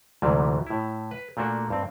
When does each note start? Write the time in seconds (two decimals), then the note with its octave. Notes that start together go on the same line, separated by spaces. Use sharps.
0.22 D2 G#2 C3 E3 F#3 G3
0.67 A2 E4
1.11 B4
1.37 A#2 A3 A#3 D4 F#4
1.70 G2 C4